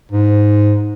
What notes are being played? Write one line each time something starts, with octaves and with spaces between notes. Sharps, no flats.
G#2